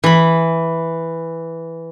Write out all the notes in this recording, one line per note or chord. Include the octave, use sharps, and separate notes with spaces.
E3 B5